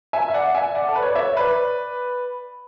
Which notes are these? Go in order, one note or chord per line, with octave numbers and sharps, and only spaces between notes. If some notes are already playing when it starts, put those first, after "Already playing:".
E5 G#5
E5
D5 F#5
E5 G#5
D5 F#5
A4
B4
C#5
D5
C#5 E5
B4 D5